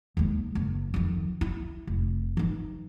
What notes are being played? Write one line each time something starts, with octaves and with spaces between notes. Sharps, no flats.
D#2 G#3
F#1
F2 D#3
E4
F1
E3 D#4